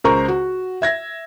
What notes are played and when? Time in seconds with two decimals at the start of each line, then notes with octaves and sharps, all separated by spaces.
0.04 C#2 A#4 C5 A#5 C#6
0.28 F#4
0.82 E5 G#6 A#6